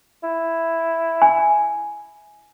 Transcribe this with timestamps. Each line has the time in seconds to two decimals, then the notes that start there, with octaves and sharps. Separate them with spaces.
0.23 E4
1.22 G#5